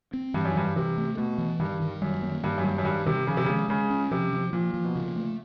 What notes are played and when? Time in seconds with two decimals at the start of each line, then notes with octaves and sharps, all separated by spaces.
0.13 C4
0.34 G2 E3
0.45 F#2
0.55 G2 E3
0.76 C3 E3
0.97 A3
1.17 B2 A3
1.38 E3
1.59 G2 D#3
1.81 D#3
2.02 F#2 G3
2.22 A#3
2.44 G2 D#3
2.58 F#2
2.64 G2 G3
2.78 F#2
2.85 G2 D#3
3.06 C3 D#3
3.27 C#3 F3
3.37 C3
3.45 C#3 G#3
3.69 C#3 G#3
3.90 C#4
4.11 C3 F3
4.33 F3
4.53 A#2 F3
4.74 F3
4.84 B2
4.95 A#2 C#3
5.16 A3